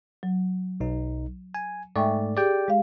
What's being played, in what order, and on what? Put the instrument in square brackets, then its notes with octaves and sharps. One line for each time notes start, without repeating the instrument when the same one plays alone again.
[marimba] F#3
[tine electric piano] B1 D#4
G#5
[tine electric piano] G#2 A3 D5 [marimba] E5 G5 C#6
[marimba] G4 G#4 [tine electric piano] D5 G5
[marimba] G#3 F5